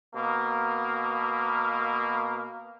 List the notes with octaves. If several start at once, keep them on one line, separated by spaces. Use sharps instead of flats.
B2 A#3